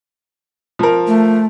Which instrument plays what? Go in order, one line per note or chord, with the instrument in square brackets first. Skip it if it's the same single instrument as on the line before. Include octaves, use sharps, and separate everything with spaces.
[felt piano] F3 A#4
[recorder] A3